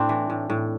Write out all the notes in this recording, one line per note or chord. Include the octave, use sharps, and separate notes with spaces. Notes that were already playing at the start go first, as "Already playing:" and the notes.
Already playing: A2 C4 D4
E3
A2
A2